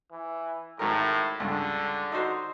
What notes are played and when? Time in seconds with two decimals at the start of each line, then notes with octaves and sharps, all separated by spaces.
0.12 E3
0.79 G#1 A2 A#4
1.40 C#2 G2 D3
2.12 D#4 F#4 C5